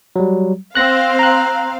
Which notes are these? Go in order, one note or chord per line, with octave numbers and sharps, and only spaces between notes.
F#3 G3
C4 F5 F#6 A#6
A#5 F#6